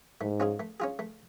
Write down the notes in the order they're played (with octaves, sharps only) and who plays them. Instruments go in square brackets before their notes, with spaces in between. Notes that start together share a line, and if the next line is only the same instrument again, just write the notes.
[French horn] G#2 [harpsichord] A3
[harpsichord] C#4 F4 G#4
A3
C#4 F4 G#4
A3